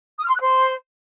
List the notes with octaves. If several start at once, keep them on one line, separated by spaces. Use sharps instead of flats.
D#6
F6
C6
F#6
C5